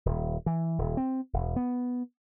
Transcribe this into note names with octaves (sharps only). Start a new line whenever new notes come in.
D#1
E3
D#1
C4
E1
B3